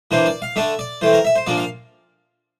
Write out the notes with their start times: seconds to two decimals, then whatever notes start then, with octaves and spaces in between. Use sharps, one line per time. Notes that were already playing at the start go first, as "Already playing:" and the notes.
0.11 E3 A#3 D4 C5
0.26 D5
0.42 F5
0.56 D3 A3 D4 E5
0.79 D5
1.01 E3 A3 C4 C5
1.13 A#4
1.25 E5
1.36 C5
1.46 A#2 F3 A#3 D4 D5
1.57 F5